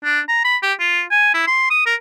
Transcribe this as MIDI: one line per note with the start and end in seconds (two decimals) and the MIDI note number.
0.04 0.20 62
0.28 0.44 82
0.44 0.57 83
0.62 0.73 67
0.80 1.02 65
1.11 1.32 80
1.34 1.42 64
1.47 1.69 84
1.70 1.84 87
1.86 1.95 70